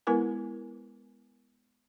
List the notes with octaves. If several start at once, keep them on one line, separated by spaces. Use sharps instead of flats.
G#3 B3 E4 A#4 B4 G#5